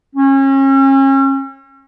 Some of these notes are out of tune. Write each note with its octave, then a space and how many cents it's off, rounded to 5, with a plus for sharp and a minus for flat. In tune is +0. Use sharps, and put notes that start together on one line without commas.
C#4 -35